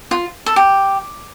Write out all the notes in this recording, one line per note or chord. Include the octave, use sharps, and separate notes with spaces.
F4
A4
G4